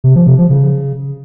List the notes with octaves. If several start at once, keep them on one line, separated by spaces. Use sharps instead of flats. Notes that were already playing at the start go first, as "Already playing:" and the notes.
C3
F3
C3
F3
C#3